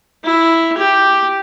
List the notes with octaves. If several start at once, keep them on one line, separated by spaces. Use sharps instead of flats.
E4
G4